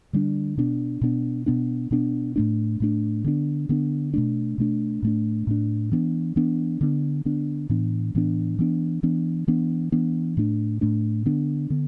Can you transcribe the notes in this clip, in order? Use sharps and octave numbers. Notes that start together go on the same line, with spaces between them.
D3 G3 D4
B2 B3 D4
B2 B3 D4
B2 B3 D4
B2 B3 D4
A2 A3 D4
A2 A3 D4
D3 B3 D4
D3 B3 D4
B2 A3 D4
B2 A3 D4
A2 A3 D4
A2 A3 D4
E3 B3 D4
E3 B3 D4
D3 B3 D4
D3 B3 D4
A2 E3 B3 D4
A2 E3 B3 D4
E3 B3 D4
E3 B3 D4
E3 B3 D4
E3 B3 D4
A2 A3 D4
A2 A3 D4
D3 B3 D4
D3 B3